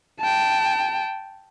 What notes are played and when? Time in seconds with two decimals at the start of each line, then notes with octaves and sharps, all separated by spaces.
0.20 G5 A5